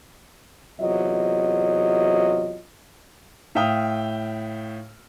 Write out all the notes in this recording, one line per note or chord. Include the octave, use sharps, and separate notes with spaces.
E2 C3 F#3 F4 D#5
A2 E5 F5 G5 D#6 F6